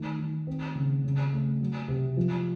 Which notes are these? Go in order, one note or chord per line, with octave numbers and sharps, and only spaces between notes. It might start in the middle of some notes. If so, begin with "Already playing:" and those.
Already playing: D#3 A3
D#3
C4
C#3
C#3
A3
F#3
C3
F3